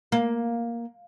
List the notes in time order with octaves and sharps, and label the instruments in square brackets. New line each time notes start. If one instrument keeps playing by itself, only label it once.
[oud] A#3